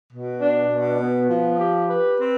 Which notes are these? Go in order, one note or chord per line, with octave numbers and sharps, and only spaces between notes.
B2
D4
B2
B3
F3
G4
B4
C4